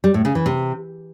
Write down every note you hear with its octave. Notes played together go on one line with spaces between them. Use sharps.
G3
A2
C#3
E3
C3